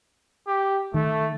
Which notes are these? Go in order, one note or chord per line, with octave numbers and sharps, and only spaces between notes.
G4
D#3 A3